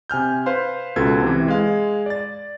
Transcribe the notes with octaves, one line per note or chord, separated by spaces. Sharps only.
C3 G#5 F6 G6
B4 C5 F5 C6
C#2 B2 F4 A4 B4 G#6
C3 E3
G#3 F5
D5 A6